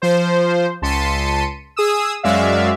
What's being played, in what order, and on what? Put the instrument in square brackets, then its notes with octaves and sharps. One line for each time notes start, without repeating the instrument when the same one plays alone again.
[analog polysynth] F3 C5
C#2 A5 C6 B6 C#7 D#7
G#4 D#6 E6
F#2 G#3 F#4 D5 E5 F5